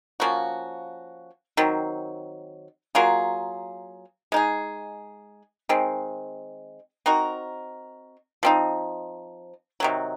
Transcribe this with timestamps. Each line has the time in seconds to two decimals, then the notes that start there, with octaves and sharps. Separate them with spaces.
0.20 F3 A#3 C#4 F#4
1.57 D#3 F#3 C4
2.95 F#3 A#3 F4 G#4
4.32 G#3 D#4 G#4
5.69 D#3 G#3 C4
7.06 C4 D#4 F#4 A#4
8.43 F3 C4 D#4
9.80 C3 D#3 F#3